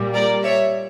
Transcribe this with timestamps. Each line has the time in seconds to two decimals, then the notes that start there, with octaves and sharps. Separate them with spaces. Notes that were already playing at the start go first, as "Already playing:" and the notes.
Already playing: A#2 G3
0.13 A#4 D5
0.43 C#5 E5